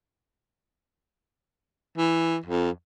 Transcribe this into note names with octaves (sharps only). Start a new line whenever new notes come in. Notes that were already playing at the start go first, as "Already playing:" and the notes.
E3
F2